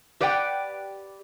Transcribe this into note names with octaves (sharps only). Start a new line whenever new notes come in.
G4 B4 D5 F#5 G5